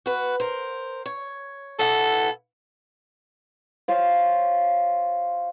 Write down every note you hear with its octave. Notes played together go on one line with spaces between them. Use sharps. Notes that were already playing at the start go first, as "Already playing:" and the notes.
F#4 B4
A#4 C5
C#5
B2 E4 A4 F#5
F4 C5 C#5 F5